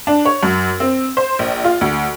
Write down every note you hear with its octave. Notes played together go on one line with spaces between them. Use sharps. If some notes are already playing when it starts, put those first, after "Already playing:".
D4
C#5
F#2
C4
C5
A#1
F4
D2